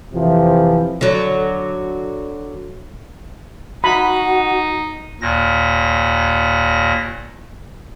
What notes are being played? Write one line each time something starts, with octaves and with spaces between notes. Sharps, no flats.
F2 C3 E3 F3
D3 F#3
D#4 F#4 B5
D#2 A#2 A#6